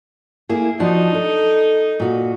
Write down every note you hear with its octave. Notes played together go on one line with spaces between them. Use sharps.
A#3 E4 G#4
F3 D4 D#4 F#4
A4
A#2 F#4